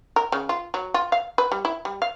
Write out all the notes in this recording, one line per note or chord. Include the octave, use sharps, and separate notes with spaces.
A#4
C#3
F4
F#3
F4
F5
B4
G3
E4
G3
F5